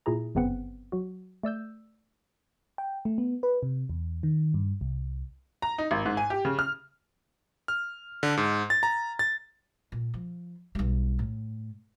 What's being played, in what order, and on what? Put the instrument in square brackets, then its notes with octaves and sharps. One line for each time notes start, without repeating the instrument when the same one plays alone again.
[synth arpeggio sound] A#2 E4 G#4 A#5
G1 F#2 C#3 B3 C4 F#5
F#3 F#4
A3 D5 E6 G6
[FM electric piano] G5
A3
B3
B4
C3
E2
D#3
G2
C2
[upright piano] A#5
D#4
G#1
G#2
G#5
G4
C#3
F6
[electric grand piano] F6
D3
G#2
A6
A#5
A6
[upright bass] A#2
F3
B1 G3
A2